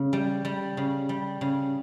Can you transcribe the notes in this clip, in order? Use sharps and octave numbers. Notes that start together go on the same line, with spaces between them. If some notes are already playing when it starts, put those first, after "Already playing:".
Already playing: C#3
G3
G3
C#3
G3
C#3